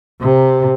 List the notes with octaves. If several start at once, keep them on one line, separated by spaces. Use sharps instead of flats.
C3